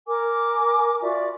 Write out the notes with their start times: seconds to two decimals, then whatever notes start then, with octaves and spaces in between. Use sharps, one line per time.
0.07 A#4 G#5 D6
1.01 F4 F#4 D5 E5